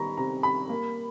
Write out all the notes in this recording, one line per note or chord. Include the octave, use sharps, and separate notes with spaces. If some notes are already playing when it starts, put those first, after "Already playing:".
Already playing: D#3 G3 B3 A#5 B5 C#6
C3 A#5
G3 B5
A#3